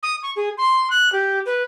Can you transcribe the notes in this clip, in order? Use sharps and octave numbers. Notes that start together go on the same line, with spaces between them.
D#6
C#6
G#4
C6
F#6
G4
B4